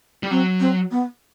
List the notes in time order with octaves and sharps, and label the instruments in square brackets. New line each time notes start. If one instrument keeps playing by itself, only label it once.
[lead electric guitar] G3
[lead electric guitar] F#3 [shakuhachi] C4
[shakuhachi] C4
B3